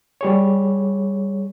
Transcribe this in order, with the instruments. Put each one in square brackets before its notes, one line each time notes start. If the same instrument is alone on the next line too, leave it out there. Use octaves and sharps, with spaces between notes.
[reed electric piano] G3 G#4 C#5